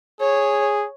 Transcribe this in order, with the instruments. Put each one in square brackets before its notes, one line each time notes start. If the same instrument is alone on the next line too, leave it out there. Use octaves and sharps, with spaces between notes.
[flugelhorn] G#4 [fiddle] C#5